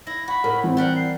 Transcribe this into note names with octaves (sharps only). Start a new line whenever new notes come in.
E4 A#6
F#4 B5
A2 A#4
E3 C4
G3 A#4 F#5 B5
C7